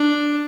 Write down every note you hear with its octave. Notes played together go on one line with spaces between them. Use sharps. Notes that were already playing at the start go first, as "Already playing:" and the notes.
Already playing: D4